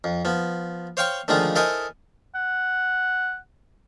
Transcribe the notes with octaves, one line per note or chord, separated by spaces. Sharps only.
F2
F3 B3
C5 C#5 F5 G5 C6 C#6
D3 D#3 F3 G#3 A3 F4
E4 A4 A#4 C5 D#5 G#5
F#5